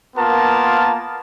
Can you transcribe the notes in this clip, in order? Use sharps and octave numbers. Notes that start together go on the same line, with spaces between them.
A#3 B3 F4 A#4 A5